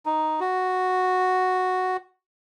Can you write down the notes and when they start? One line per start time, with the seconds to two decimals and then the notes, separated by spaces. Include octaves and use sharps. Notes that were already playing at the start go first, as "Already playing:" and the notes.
0.06 D#4
0.40 F#4